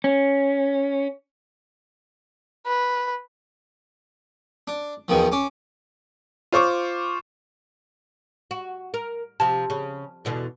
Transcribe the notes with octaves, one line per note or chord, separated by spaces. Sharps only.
C#4
B4
D4
E2 B2 D#3 F3
C#4 D6
F4 C5 C#6 D6
F#4
A#4
C3 F3 A5
C#3
E2 B2 D3